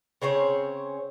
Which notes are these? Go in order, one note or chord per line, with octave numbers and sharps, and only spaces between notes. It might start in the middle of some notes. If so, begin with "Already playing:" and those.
C#3 C4 C5 C#5